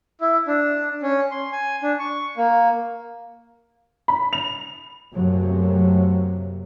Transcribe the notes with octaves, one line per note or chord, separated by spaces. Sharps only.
E4
D4
C#4
C6
G#5
D4
C#6
A#3
B5
F7
F#2 C3 F#3 A3 A#3